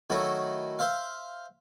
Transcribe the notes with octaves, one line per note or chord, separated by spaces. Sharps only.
D#3 F#3 A3 E4 F#4
C5 E5 F5